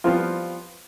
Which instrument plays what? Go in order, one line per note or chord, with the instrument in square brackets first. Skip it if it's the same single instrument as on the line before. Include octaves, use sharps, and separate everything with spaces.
[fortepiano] F3 G3 B3 C4 F4